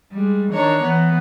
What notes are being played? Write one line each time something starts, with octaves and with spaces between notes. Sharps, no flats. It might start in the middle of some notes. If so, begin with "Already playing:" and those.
G3 G#3
D#3 D4 C#5 A#5
E3 B3